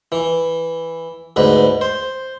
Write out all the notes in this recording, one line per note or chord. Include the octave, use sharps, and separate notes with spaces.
E3
D2 G#2 B4
C5